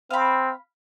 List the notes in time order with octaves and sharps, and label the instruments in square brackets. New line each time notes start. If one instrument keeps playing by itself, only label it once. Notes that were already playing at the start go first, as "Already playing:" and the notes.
[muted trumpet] C4 [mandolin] F5 B5